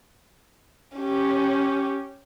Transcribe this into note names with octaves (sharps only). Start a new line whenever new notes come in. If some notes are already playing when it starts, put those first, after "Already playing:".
C#4 G4